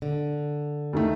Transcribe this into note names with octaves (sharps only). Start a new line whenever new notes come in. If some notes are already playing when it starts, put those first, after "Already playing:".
D3
D#2 D#3 A3